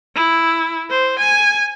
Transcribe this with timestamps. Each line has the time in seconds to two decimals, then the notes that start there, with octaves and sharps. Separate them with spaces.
0.15 E4
0.90 C5
1.19 G#5